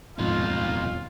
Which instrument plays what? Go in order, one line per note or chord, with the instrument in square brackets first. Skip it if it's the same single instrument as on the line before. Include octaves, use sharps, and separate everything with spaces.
[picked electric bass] D#1 F2 [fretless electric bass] G#2 [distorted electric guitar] B2 D#4 [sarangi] F4